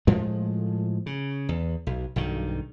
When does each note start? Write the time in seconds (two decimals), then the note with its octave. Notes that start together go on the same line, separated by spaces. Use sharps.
0.07 A2 F3 G#3 A3
1.06 C#3
1.49 E2
1.87 B1
2.16 B1 G2 D#3